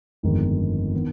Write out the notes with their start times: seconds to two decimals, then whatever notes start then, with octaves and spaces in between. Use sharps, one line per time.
0.23 G1 F2 D#3 G#3 B3
0.94 D#3 B3